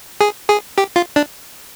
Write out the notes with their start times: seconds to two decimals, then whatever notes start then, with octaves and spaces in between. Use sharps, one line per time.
0.21 G#4
0.49 G#4
0.78 G4
0.96 F4
1.16 D4